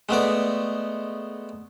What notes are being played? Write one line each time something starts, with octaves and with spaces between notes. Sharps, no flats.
G#3 A3 B3 D5